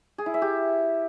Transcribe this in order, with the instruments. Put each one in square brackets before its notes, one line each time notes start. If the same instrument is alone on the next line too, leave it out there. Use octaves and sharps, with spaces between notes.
[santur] G#4
E4
E5
G4